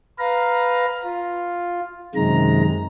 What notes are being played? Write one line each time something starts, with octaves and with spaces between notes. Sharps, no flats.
B4 F5 A#5
F4
F#2 C3 D#3 G#3 A#5